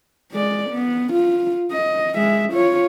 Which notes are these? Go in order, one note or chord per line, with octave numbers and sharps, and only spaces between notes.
G#3 D5
B3
F4
D#5
G#3 E5
F4 C#5